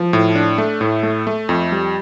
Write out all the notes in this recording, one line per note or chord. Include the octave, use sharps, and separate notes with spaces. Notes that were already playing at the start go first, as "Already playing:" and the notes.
Already playing: F3
A2
D4
A3
A2
A3
A3
F2
G3